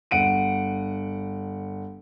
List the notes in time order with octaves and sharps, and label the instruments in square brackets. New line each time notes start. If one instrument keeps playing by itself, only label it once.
[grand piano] G1 F#5 D7 D#7